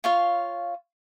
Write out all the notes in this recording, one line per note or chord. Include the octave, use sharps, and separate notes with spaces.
F4 C#5 F5